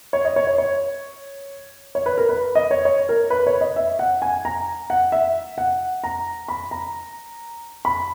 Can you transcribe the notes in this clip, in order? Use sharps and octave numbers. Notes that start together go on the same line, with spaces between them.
C#5
D#5
C#5
C#5
C#5
C#5
B4
A#4
B4
D#5
C#5
C#5
A#4
B4
C#5
D#5
E5
F#5
G#5
A#5
F#5
E5
F#5
A#5
B5
A#5
B5